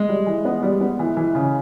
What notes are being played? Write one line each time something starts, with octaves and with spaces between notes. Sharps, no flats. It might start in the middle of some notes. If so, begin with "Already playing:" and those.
Already playing: G#3
G3
E3
B3
G3
B3
E3
E3
C#3